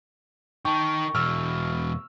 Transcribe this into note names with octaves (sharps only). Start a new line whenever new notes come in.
D#3 G5 A5 C#6
E2 B2 E6 F6